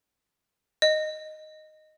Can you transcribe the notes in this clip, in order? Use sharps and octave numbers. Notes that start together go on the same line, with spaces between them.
D#5